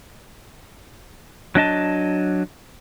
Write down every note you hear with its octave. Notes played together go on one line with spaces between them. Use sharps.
F#3 D4 D#5 A5